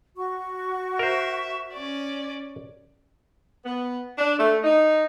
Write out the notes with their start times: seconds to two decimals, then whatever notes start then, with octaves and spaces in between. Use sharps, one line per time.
0.16 F#4 C#6
0.99 A#4 C5 E5
1.74 C#4 D5
3.65 B3
4.18 D4
4.39 A3
4.64 D#4